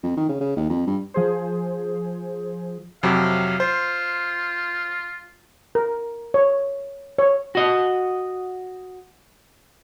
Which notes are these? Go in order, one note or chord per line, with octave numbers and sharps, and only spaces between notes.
F2
D#3
C#3
C#3
D#2
F2
G2
F3 G#4 C5
F2 C3 F#3 F5
F4 C5
A#4
C#5
C#5
F#4 D#5